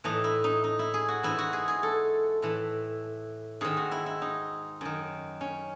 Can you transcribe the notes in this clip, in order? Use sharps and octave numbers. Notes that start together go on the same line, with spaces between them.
A2 E3 D#4
E4
D#4
D#4
E4
G#4
F#4
G#2 E3 E4
F#4
G#4
G#4
A4
A2 E3
G#2 D#3 G#4
F#4
E4
E4
D#4
F#2 D#3
C#4